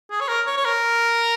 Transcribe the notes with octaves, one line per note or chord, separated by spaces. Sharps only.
G#4
C#5
A#4
C#5
C#5
A#4